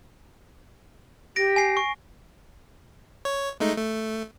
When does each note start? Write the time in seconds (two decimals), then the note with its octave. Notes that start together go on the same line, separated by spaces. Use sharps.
1.36 G4 A#6 D7
1.56 G#5 C7
1.77 C#6
3.25 C#5
3.60 G#3 A3 D#4
3.78 A3